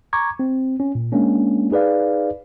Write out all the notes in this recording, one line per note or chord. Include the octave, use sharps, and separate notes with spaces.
A#5 C#6 D6 G#6
C4
C#4
A#2
G#3 A#3 C#4 D4
D#4 G#4 B4 D5 F5